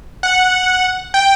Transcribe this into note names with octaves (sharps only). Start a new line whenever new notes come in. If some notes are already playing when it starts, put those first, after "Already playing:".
F#5
G5